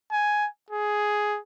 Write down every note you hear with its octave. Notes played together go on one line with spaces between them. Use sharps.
G#5
G#4